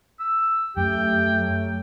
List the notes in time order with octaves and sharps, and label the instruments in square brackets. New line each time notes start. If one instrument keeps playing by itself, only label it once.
[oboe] E6
[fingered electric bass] F#2 [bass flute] A3 [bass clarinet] G4 [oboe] G5
[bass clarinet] F#3